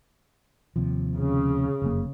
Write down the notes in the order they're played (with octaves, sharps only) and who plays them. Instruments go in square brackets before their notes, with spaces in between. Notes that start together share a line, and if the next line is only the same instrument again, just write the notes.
[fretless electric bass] D#2 C3 F3
[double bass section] C#3
[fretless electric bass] F1 F#2 A#3